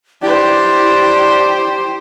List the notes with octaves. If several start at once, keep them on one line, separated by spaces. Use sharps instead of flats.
D4 E4 G4 C5 D5